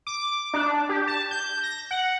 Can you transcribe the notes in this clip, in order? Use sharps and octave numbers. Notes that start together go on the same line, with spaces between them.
D6
D4
G4
A5
G6
A#6
F#5